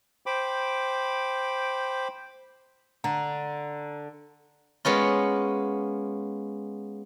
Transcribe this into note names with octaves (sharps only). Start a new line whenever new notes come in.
C5 G5 B5 D6
D3 A#5
G#3 B3 C#4 F4